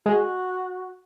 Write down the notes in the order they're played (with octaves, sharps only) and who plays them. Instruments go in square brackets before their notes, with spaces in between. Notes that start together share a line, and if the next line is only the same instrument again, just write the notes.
[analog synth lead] G#3 [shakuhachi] F#4